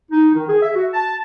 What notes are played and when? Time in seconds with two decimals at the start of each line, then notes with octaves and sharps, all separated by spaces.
0.11 D#4
0.34 D#3
0.48 G#4
0.62 E5
0.75 F#4
0.94 A5